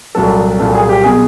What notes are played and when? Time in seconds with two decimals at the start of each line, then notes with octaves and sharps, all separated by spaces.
0.15 C2 A#2 F#3 A4
0.59 C2 A#2 F#3 A4
0.75 G#4
0.89 G4
1.04 B2 F#3 G#4